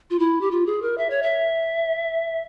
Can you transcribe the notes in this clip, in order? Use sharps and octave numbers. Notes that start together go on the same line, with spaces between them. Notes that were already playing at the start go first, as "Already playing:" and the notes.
F4
E4
G4
F4
G#4
A#4
E5
C#5
E5